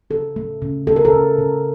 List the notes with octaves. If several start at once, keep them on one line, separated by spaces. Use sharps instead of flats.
C#3 A4
A3
C#3
A3 A4
A#4
A4
C#3
C#3